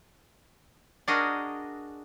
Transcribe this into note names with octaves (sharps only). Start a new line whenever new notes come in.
D4 F#4 G#4 A#4 D#5